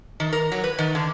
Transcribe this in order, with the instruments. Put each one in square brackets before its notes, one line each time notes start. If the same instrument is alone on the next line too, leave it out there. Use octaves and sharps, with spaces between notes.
[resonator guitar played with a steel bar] D#3
A#4
F#3
B4
D#3
D3